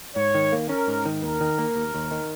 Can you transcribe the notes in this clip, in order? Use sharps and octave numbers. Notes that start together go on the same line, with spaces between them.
G#2 C#5
D#3
A#3
C#4 A#4
G#2
D#3
D#2 A#4
D#3
A#3
D#2
D#2
D#3